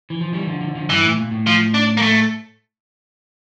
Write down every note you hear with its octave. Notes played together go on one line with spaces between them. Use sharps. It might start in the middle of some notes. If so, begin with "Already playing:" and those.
E3
F3
E3 G3
D3 F3
D3 F3
D3 F3
G2 E3
A2
A#2
A2
F3
D4
A#3
A3